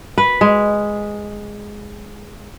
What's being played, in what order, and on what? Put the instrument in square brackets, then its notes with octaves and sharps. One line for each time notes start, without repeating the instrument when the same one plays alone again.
[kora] B4
G#3